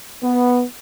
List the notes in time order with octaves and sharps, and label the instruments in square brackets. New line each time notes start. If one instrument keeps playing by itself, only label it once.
[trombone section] B3